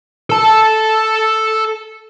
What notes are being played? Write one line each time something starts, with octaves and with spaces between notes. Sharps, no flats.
A4 A5